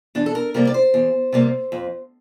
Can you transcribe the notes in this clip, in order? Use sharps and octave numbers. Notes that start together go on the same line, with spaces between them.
E2 D4
A4
A#4
C3 G3 A#3 A#4
D5
C5
E2
C3 G3 A#3
F2